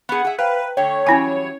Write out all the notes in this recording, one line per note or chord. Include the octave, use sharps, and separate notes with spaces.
B3 G#4 F#5
G#4 E5
B4 C5 F5 G5 A#5
D3 A3 C#5 G5
E3 F#3 G3 C#4 E4 G#5